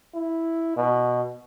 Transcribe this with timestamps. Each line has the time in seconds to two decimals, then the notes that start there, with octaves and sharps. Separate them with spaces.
0.15 E4
0.77 B2